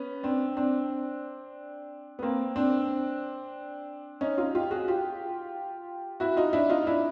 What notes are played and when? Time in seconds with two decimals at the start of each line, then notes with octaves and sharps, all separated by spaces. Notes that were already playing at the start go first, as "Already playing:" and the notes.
Already playing: B3 C#4
0.23 C4 D4
0.57 C4 D4
2.19 B3
2.22 A#3 C4
2.56 C4 D4
4.21 C#4 D#4
4.38 D#4 F4
4.55 F4 G4
4.71 F#4 G#4
4.88 F4 G4
6.20 E4 F#4
6.37 D#4 F4
6.53 D4 E4
6.70 D#4 F4
6.87 D4 E4